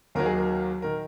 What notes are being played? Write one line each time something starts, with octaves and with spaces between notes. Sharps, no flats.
D#2 D#3 F#3 A#4
G#4
A#4
D#3 A#4